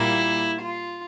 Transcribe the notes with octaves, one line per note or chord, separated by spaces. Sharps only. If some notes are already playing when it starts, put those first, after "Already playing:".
Already playing: A#2 G3 A#3 E4
F4